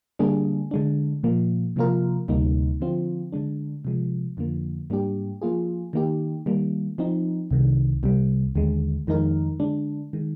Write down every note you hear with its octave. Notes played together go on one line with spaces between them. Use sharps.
D3 G3 A#3 D4 G#4
D3 G#3 D4
A#2 F3 A#3
C3 F3 A#3 F4 A#4
D2 C3 G3 A#3 D#4
D3 F3 C4 F4
D3 G#3 D4
C3 F3 G#3
F2 D3 F3 A#3
G#2 G3 A#3 D4 G4
F3 A#3 F4 G#4
D#3 A#3 D#4 G4
D#3 G3 A#3
F3 C4 D#4
C2 C3 D#3
C2 C3 G3
D#2 D3 G#3
F2 D#3 G#3 D#4 A#4
D3 G#3 D4
D#3 G#3